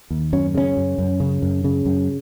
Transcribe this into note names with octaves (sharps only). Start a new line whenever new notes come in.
D#2
F#2 C#4
C#3 C#4
F#2
F#2
C#3
F#2
C#3
F#2